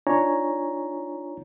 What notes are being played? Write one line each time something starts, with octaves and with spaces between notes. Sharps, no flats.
D4 D#4 F4 C#5 G#5 A#5